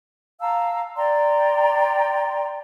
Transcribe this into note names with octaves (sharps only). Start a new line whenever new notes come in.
F5 A5 A#5 E6
D5 G5 A#5 C6